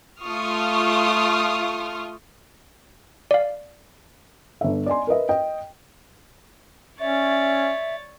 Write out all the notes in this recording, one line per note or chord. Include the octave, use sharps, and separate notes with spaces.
A3 F4 C#6 D#6 F6
D5 F5
G1 E5
D5 D#5 G#5 C6
A#4 B4 D#5 E5
D#5 G5
C#4 C#5 D5 E5 A6